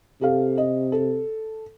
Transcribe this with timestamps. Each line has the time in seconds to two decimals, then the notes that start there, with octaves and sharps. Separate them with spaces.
0.21 C3 G4 A4 F5
0.58 D#5
0.92 A4